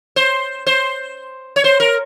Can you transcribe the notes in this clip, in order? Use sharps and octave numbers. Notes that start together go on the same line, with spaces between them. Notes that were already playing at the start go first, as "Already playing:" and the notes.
C5
C5
C#5
C5
A#4